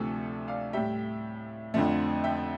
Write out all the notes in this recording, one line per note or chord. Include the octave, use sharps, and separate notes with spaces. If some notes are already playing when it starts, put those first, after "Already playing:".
Already playing: D2 C3 F3 A3 A4
D5 F5
A2 G3 E5 G5
F2 D3 F3 A3
E5 G5